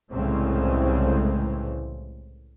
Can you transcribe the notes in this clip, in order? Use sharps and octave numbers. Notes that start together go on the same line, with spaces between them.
C2 A2 C#3 E3 G#3 C4